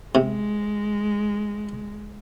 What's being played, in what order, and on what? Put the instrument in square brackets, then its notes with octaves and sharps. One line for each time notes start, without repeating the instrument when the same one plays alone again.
[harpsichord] C3 [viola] G#3